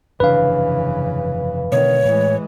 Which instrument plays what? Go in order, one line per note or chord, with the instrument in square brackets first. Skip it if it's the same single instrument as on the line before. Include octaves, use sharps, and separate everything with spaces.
[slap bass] F1 G2 D4 [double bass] C#3 E3 [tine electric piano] B4 F5
[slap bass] B2 D3 G#3 [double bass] D#3 [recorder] C#5
[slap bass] A2 [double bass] E3 G#3